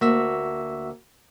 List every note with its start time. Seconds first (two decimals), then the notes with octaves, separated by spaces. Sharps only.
0.01 D2 A#3 F#4 E5 E6